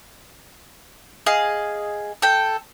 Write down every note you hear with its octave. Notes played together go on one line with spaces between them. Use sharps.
G#4 D#5 F5
A4 G5